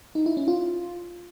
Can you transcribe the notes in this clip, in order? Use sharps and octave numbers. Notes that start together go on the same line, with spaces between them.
D#4
E4
C#4
F4